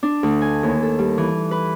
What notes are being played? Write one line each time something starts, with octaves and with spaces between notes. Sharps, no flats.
D4
D2
G#5
D#2
A4
G3
E3
B4